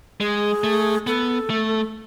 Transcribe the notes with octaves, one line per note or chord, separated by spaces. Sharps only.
G#3 G#4
A3
B3 A4
A3